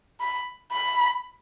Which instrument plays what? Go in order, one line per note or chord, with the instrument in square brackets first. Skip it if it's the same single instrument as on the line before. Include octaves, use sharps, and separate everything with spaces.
[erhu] B5
B5